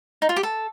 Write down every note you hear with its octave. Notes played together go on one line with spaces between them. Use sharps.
D#4
F4
G4
A4